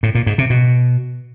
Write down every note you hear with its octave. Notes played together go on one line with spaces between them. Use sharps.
A2
A#2
G#2
C3
B2